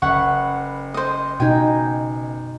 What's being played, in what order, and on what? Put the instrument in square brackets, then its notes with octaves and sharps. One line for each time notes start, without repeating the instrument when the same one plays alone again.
[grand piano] F#1 E5 [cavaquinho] B4 F#5 C#6
[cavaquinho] C5 D#5
[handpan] B2 D#4 [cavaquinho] G5 G#5